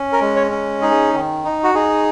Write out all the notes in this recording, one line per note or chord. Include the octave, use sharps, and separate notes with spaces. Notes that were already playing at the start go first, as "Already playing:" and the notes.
Already playing: C#4
A#4
G#3
C#5
C#4
D#4 G#4
D#3
D#4
F#4
D#4 G#4